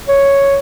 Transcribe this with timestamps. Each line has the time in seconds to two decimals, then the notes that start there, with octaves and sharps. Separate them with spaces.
0.09 C#5